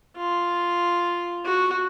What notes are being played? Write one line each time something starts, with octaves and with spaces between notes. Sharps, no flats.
F4
F#4